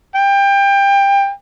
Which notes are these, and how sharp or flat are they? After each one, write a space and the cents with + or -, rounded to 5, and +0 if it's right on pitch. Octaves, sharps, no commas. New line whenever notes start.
G5 +25